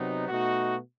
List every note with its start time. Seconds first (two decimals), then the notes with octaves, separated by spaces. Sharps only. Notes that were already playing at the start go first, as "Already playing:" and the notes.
Already playing: C3 F#3 B3 D#4
0.28 B2 A3 D#4 F#4